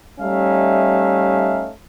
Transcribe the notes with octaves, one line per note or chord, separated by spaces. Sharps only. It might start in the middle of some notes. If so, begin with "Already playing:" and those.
G3 A3 C#4 D#4 E5 F5